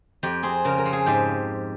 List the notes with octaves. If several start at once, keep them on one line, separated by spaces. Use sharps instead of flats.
F2 G4
C4 G#4
C#3 A#4
A#4
F3
G#4
G#2 G4